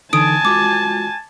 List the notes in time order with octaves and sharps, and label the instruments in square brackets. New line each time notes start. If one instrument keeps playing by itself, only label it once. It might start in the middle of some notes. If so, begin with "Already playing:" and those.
[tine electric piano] D3 E3 D#4 [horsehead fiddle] G#5 A5 [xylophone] D#6 D7
[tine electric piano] G#3 F4 F#4 [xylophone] D6